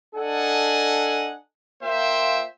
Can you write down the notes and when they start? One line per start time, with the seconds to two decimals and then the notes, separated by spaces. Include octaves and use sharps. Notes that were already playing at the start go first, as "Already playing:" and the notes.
0.15 D4 A4 D#5 F#5 G#5
1.83 A#3 F4 C5 E5 G5